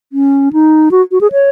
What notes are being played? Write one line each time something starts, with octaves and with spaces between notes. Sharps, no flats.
C#4
D#4
F#4
F#4
G#4
C#5